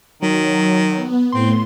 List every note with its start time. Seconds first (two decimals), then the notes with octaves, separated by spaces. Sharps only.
0.22 D#3 F#3
0.95 B3
1.32 A2 C4 C6